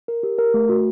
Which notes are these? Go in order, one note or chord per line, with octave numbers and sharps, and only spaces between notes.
A#4
G4
A#4
A3
F#4